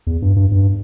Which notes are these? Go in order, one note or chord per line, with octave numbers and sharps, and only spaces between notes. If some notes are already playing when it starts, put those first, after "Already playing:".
E2
G2
G2
G2